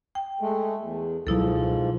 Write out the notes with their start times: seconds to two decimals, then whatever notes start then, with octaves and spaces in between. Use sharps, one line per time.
0.15 G5
0.41 G#3 A3
0.81 E2
1.27 C#2 G#2 B2 F3 F#3 E4 A4